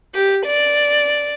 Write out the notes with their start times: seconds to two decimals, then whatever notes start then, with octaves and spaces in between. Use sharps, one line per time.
0.15 G4
0.46 D5